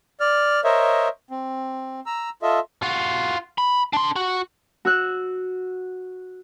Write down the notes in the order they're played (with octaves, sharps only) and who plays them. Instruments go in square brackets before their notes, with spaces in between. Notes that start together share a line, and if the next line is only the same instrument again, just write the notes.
[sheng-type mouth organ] D5 F6
A#4 C5 C#5 D#5 E5
C4
A#5 E6
F4 A4 D#5 E5
[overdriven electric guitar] F4 F#4
B5
D4 C6
F#4
[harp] F#4 E6 F#6